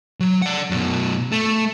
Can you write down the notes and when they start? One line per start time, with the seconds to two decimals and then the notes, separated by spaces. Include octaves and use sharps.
0.20 F#3
0.42 D5 F#5
0.70 F#2 B2
1.32 A3